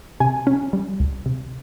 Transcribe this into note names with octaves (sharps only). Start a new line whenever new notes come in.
C3 G#5
C#4
G3
C#2
C3